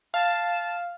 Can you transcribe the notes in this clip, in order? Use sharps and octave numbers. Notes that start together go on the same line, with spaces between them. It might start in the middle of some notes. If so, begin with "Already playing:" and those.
F5 A5